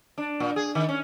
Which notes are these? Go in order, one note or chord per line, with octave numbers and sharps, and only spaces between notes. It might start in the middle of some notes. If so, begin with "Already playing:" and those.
D4
A#2
G#4
D#3
C#4